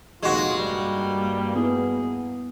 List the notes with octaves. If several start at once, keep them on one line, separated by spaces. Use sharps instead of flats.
F1 A#1 D#2 G#3 F4 F#4
G2 G3 A#3
B3 E4 G#4